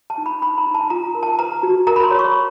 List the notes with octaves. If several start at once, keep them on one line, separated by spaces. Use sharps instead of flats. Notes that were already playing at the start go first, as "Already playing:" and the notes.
A5
D#4
B5
D#4 B5
A#5
D#4
A5
F4 A#5
A#4
A5
B4 A#5
F#4
A#4 A#5
B5
C6
C#5
C#6